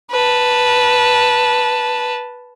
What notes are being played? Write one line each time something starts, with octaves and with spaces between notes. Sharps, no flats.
B4 A5